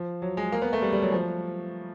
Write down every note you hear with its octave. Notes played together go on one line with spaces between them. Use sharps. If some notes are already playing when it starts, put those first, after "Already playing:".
Already playing: F3
F#3
G#3
A#3
B3
A3
G3
G3
F#3
F3